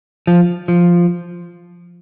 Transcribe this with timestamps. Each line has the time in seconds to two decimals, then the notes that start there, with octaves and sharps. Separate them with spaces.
0.27 F3
0.68 F3